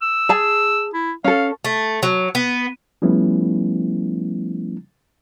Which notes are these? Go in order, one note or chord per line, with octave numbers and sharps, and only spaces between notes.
E6
G#4 A5
E4
C#4 A4 F5
A3
F#3
B3
F3 G3 A3 B3 C#4 E4